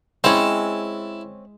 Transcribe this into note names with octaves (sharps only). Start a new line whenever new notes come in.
G#3 C4 C#4 E4 A5